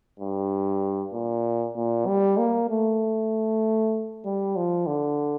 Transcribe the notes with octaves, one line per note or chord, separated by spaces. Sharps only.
G2
A#2
A#2
G3
A#3
A3
G3
F3
D3